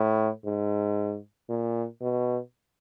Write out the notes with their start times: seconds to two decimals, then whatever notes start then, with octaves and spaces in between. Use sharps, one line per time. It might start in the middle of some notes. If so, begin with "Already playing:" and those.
Already playing: A2
0.45 G#2
1.49 A#2
2.01 B2